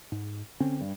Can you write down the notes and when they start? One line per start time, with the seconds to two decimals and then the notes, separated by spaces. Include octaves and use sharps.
0.12 G#2
0.60 D3 C4 C#4
0.81 G2